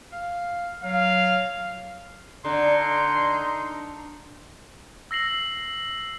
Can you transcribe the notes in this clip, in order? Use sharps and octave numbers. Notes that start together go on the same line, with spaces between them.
F5
F#3 F5
D3 D#4 C6
E6 A#6 C7 F#7